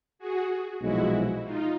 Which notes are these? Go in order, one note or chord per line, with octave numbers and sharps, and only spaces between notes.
F#4 G#4
B1 A#2 F3 G#3 E4 F#4
D#4 F4